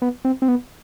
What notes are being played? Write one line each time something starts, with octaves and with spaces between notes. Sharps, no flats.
B3
C4
C4
B3